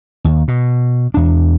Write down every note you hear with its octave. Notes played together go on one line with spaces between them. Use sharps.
D#2
B2
E2 D4